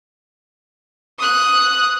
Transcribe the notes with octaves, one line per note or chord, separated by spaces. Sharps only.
D#6 F#6